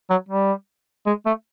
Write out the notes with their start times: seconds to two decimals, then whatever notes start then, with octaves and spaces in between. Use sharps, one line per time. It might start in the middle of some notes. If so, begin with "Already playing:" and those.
0.10 F#3
0.29 G3
1.06 G#3
1.26 A3